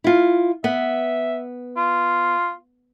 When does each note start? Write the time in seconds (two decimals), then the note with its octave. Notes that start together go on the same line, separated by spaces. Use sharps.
0.04 E4 F4
0.64 B3 E5
1.76 F4